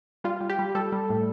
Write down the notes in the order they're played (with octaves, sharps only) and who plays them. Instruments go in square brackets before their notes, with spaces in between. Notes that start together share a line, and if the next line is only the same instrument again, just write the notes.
[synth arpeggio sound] G3 F4
G3
G4
G3
G3 A4
G3
A2